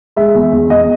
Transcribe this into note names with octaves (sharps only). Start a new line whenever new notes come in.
G#3 E5
E2
E2
E2 D#5